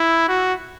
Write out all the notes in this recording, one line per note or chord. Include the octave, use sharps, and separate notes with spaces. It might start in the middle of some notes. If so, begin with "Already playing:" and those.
Already playing: E4
F#4